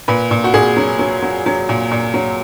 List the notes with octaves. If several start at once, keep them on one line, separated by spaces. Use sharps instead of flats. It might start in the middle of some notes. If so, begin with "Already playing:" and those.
A#2 B4
A#2
F#4
A#2 G#4
F#3
F#3
F#3
F#3
A#2
A#2
F#3